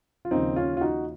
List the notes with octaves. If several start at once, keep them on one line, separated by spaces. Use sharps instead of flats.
F4
D#2 C#3 F3 C4 D#4
C#4 F4
F4
D#4 F#4